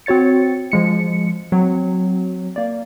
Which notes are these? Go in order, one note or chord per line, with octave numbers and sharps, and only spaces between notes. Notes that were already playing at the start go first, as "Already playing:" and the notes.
C4 F#4 C#5 A6 C#7
F3 G#3 C#7
F#3 C4
A#3 D5